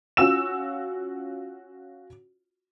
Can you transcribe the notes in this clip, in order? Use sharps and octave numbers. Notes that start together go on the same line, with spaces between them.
C#4 F4 F#4 E6 E7